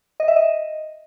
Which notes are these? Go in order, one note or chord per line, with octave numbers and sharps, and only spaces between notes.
D#5
E5
D#5